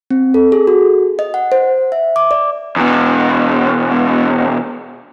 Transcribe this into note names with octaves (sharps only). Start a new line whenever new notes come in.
C4
A4
G#4
F#4
D#5
F#5
C5
E5
D6
D5
E2 B2